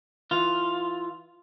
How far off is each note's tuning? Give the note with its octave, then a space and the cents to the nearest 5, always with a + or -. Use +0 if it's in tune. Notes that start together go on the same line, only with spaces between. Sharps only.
E3 +0 F4 +0